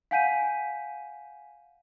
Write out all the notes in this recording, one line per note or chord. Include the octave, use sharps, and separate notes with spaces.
F5 F#5 G#5 G6 B6 D#7